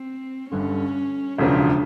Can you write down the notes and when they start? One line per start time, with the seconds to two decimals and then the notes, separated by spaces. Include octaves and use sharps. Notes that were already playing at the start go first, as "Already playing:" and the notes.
Already playing: C4
0.51 G1 G2 D3 C#4
1.38 E1 D2 C#3 F3 D4